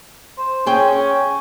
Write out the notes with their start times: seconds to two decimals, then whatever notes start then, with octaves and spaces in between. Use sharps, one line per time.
0.38 C5
0.67 C#4 G#4 G5